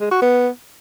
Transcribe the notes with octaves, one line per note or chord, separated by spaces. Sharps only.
G#3
F#4
B3